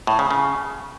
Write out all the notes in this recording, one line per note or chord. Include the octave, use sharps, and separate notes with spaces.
A2
C#3
C#3